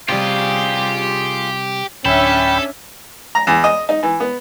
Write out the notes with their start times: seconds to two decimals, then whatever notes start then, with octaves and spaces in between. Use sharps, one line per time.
0.09 C3 G3 F4 G4 G#4
2.05 D1 C#4 D4 A4 E5 G5 B5
3.35 A#5
3.47 E2
3.64 D#5
3.89 D#4
4.03 E3
4.20 B3